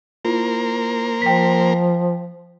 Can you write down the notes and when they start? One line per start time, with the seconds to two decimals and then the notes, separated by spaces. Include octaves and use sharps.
0.25 A#3 E4 F4 A#4 C5
1.22 F3 G5 B6